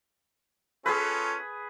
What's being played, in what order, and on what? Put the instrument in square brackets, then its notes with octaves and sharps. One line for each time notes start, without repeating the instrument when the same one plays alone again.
[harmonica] C#4 F4 A4 [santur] G#4 B4